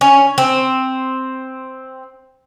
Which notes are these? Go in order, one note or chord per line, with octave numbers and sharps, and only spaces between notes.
C#4
C4